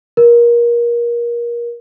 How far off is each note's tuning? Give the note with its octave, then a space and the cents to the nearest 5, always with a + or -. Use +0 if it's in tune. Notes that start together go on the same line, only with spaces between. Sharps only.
A#4 +25